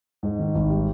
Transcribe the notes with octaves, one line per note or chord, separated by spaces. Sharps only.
G#2
D#3
G#1
G3